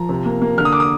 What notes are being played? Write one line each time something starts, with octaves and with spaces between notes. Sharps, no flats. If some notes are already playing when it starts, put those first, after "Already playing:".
Already playing: F3 A#5
C3
A#3
A#3
D3 F6
D#6
D6
D#6